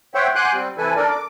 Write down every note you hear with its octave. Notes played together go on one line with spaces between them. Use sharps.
C5 C#5 E5 F#5 G5
F#5 G#5 C6 D6 F#6 G6
G3 C4
C3 E3 E4 A4 B4 G#5
D4 A4 A#4 D5
D6